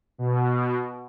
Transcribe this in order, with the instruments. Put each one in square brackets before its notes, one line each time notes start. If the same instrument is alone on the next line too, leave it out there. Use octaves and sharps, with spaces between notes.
[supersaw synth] B2